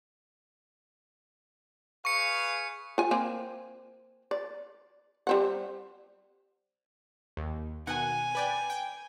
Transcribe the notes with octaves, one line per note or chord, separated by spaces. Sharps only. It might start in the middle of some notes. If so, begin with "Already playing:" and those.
G#4 B4 F5 C#6 C#7
F4 G#5
A#3 C4 G#5
D5
G3 C4 F#5
D#2
B2 D#3 F#5 G#5
B4 D5 G5
G5